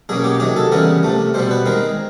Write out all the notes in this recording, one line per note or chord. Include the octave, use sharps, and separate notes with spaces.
B2 F#3 A#3 C#4 G#4
G4
C3 D#3 F#3 G#4
A4
C#3 E3 G3 B3 A#4
C3 F3 A3
B2 G3 B3 C5
B4
D#3 G#3 C4 A#4